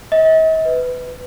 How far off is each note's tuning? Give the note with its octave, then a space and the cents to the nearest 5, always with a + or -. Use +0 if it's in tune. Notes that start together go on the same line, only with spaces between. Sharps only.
D#5 +45
B4 +15